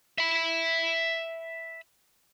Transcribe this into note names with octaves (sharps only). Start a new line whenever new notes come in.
E5 B5